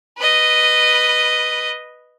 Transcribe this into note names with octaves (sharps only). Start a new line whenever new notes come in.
B4 D#5